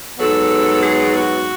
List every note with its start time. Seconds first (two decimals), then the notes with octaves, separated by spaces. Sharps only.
0.19 G#2 F#3 B3 A4
0.83 G#4
1.15 F#4